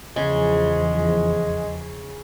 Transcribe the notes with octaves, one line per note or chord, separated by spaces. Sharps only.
E2 C#3 F3 G#3